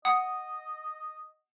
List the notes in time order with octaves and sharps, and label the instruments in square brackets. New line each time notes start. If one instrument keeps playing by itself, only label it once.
[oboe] D#5 [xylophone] F#5 D#6